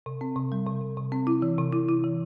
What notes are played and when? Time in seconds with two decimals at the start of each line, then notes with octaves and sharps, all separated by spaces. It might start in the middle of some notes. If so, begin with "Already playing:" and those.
0.06 C3
0.21 C4
0.36 C3
0.52 G3
0.66 C3
0.81 C3
0.97 C3
1.12 C4
1.27 E4
1.42 E3
1.58 C3
1.72 E4
1.89 E4
2.04 E3